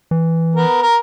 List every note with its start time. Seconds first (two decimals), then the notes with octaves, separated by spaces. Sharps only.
0.11 E3
0.56 B3 A#4
0.82 A#4